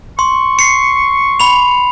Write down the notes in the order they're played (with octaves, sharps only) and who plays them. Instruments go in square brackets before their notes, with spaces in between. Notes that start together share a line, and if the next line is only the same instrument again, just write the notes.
[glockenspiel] C6 [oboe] C#6
[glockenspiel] C7 C#7
B5 F7